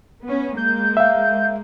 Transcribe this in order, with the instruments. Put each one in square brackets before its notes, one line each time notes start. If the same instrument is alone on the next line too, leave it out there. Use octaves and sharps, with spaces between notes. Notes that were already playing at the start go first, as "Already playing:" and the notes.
[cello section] B3 C#4
[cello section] G#3 A#3 [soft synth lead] G6
[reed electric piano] E5 F5